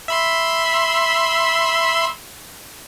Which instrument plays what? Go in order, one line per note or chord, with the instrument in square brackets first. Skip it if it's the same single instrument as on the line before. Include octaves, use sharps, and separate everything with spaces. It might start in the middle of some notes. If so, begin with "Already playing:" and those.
[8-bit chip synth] E5 B5 C6